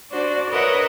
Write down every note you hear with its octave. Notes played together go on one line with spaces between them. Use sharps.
D4 F#4 C5 D5
A#4 B4 C#5 D#5 E5 F#5